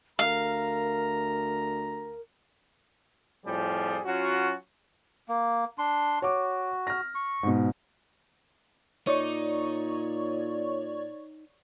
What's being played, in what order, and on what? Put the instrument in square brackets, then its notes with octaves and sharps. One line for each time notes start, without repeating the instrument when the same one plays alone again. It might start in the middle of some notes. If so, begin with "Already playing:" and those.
[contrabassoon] D2 [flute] A#4 [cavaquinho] F5 [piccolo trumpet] A#5
[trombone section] F2 A2 F3 G3 G#4
F#3 C#4 F4 F#4
[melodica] A#3
D4 C6
[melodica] F#4 [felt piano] C#5 D6
[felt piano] F6 A#6
[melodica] C#6
[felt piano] G#2 B2
[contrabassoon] A#2 [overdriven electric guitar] D#4 [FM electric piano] C#5 D5 C#6